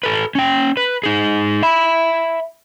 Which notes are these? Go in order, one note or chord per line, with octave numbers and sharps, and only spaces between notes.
A4 B4
C#4 G5
B4
D#4 G#4
E5 B5